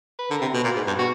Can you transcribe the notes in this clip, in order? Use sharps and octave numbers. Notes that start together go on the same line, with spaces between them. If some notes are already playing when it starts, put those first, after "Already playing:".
B4
D3 A#4
C3
B2
A#2
G#2
G2
B2 F#4